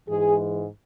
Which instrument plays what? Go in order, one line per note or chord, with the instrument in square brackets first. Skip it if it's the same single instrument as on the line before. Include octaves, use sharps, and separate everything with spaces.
[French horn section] G#2 E3 G#3 G#4